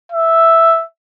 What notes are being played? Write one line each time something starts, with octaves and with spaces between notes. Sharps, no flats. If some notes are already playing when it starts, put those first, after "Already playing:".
E5